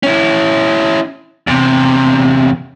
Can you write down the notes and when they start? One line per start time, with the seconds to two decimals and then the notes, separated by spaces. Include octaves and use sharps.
0.03 C#4 E4
1.47 E2 C3